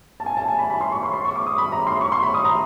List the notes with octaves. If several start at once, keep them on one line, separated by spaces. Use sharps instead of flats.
A5
G#5
A5
G#5
B5
B5
C6
C#6
C6
C6
C#6
D6
D#6
B5
A#5
C6
C#6
C6
B5
D#6
A#5